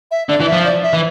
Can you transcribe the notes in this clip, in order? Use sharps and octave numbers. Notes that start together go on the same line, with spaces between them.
E5
D3 D5
E3
E5
F3
D5
E5
E3